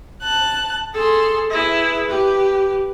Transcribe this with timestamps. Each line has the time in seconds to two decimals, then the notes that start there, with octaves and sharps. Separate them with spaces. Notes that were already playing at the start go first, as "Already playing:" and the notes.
0.22 A5 F#6
0.94 G#4 A4 C6
1.50 E4 G#4 B4
2.08 G4